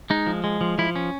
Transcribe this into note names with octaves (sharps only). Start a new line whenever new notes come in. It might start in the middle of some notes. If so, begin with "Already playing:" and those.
G#3 D#4
F3
G#3
F3
F3 E4
C#4